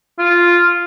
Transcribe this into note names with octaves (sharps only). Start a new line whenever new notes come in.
F4